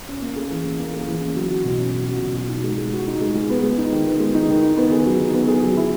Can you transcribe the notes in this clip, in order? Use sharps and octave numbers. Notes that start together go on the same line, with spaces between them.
C#4
A#3
G#4
E3
C#4
A#3
G#4
E3
C#4
F#3
F#4
B2
C#4
F#3
F#4
B2
F#4
D#4
G#3
G#3
F#4
D#4
G#3
G#3
B3
G#3
D#4
D#3
B3
G#3
D#4
D#3
D#4
B3
G#4
F#3
D#4
B3
G#4
F#3
E4